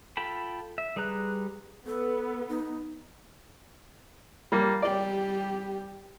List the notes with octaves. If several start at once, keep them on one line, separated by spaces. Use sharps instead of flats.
F4 A4 G5 A5 B5
E5
G3 G#4 B4 A#5 F#6
B3 A4
D#4
G3 A#3
G3 G4 D5